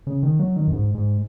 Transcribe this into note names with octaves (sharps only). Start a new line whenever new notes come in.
C#3
D#3
F#3
D#3
F#2
G#2
G#2